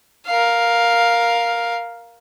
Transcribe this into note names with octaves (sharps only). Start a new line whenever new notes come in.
A#4 F5